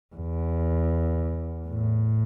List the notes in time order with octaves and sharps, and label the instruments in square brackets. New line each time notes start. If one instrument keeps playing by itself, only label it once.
[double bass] E2
A2